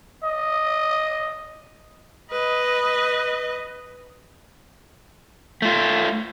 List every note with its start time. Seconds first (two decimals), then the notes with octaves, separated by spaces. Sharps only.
0.23 D#5
2.31 B4 D#5
5.62 A3 F4